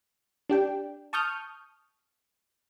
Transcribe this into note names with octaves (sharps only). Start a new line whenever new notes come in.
D4 G4 G5
A5 C#6 D#6 F6 G6